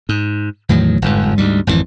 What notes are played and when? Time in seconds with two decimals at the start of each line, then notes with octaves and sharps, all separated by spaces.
0.09 G#2
0.69 E2 A2 D#3 F#3
1.02 G1 F2 G#2
1.38 D2 G#2 G3
1.67 G#1 F2 D3 E3